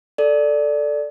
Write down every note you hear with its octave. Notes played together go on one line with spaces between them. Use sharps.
A4 D5